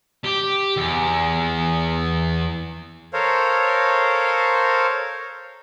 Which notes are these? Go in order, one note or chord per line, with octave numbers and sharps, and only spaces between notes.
G4
E2
A4 A#4 C5 C#5 F5